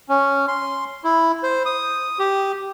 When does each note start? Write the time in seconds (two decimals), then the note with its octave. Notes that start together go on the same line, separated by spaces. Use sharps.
0.09 C#4
0.48 C6
1.04 E4
1.43 C5
1.66 D#6
2.19 G4